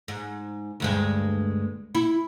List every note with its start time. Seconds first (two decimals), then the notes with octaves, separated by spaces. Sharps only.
0.08 G#2
0.80 D2 G2 G#3
1.95 E4